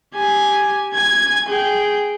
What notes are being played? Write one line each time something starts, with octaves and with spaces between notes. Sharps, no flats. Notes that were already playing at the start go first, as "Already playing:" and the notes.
G4 G#5
G#5 G#6
G#4 G5